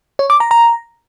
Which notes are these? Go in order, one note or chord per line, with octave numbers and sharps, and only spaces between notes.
C#5
D6
A#5
A#5